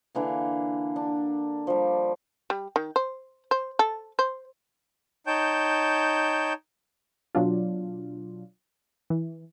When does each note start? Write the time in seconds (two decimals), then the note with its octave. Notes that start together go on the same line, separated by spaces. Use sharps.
0.15 D3 E3 A#3
0.96 D4
1.67 F3 G3
2.50 G3
2.76 D#3
2.96 C5
3.51 C5
3.79 A4
4.19 C5
5.27 D#4 C#5 G5 A5 G6
7.35 B2 F#3 D4 F4
9.10 E3